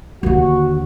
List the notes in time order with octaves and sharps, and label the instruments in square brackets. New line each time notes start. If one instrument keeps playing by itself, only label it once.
[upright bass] D#2 D3 [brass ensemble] F#4